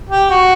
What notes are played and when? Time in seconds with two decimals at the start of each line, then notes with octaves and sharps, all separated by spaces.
0.10 G4
0.30 F#4